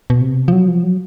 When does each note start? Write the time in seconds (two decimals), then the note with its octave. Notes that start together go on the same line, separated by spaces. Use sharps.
0.10 B2
0.21 C3
0.48 F3
0.52 F#3
0.68 F3
0.83 F#3